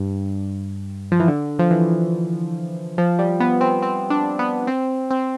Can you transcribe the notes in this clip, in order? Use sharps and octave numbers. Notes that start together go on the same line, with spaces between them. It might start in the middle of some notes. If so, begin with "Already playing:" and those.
Already playing: G2
F3
E3
D3
F3
E3
F3
G3
B3
C4
C4
D4
B3
C4
C4